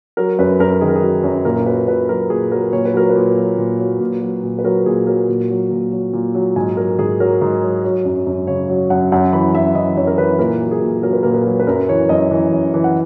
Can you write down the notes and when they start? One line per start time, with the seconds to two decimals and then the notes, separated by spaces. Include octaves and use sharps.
0.17 F#3 A#4
0.39 F#2 B4
0.59 F#2 A#4
0.81 D#3 G#4
0.89 A#4
0.96 G#4
1.02 F#3
1.23 F#2
1.45 A#2 A#4
1.66 F#3 B4
1.88 A#2 B4
2.09 F#3 A#4
2.30 A#2 G#4
2.51 F#3 A#4
2.73 A#2 C#5
2.85 B4
2.94 F#3 A#4
3.10 B4
3.15 A#2
3.37 F#3
3.58 A#2
3.79 F#3
4.00 A#2
4.22 F#3
4.43 A#2
4.59 B4
4.64 F#3 A#4
4.86 A#2 G#4
5.07 F#3 A#4
5.29 A#2
5.50 F#3
5.71 A#2
5.92 F#3
6.13 A#2
6.35 F#3
6.56 G#2 G#5
6.77 F#3 A#4
6.99 G#2 G#4
7.20 F#3 A#4
7.42 G#2
7.63 F#3
7.84 F#3 C#5
8.05 F#2
8.27 F#2
8.47 C#3 C#5
8.69 F#3
8.90 F#2 F#5
9.12 F#2 F#5
9.33 E3 B5
9.54 F#2 E5
9.75 E3 D#5
9.97 F#2 C#5
10.07 A#4
10.18 E3 B4
10.39 A#2 A#4
10.61 F#3
10.71 G#4
10.82 A#2
11.03 F#3 A#4
11.13 B4
11.23 A#2 A#4
11.33 B4
11.43 F#3 A#4
11.60 B4
11.67 F#2 A#4
11.89 E3 C#5
12.09 F#2 D#5
12.31 E3
12.52 F#2
12.74 E3
12.84 F#5